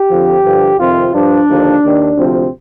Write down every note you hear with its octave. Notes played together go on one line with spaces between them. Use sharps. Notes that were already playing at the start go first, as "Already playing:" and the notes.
Already playing: G4
F2 D3 F3
G2 D3 F3
F2 C3 D#3 F4
G2 F3 D4
D#2 D3 F3
D#2 D#3
D2 C3 F3 C4